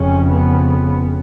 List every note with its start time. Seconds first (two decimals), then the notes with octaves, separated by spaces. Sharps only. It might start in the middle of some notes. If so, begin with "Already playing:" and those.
Already playing: F1 F2 C#3 C#4
0.30 B3